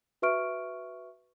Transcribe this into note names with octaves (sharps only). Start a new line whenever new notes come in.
F#4 B4 E5 C#6 F6 D7